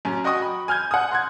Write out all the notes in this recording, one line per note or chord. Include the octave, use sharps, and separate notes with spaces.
F#2 C#4
F#4 D#5 G5 C#6 D#6
B5
G#5 F6 G6 G#6
F#5 D#6
C6 F#6 G#6